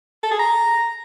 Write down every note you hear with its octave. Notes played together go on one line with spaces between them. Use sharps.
A4
G#4
A#5